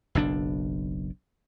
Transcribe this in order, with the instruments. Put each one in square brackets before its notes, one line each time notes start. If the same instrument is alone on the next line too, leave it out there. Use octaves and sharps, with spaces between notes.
[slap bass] F#1 B1 D4